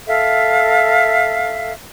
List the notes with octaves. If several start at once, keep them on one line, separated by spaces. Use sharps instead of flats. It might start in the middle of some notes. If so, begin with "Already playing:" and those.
A4 E5 F5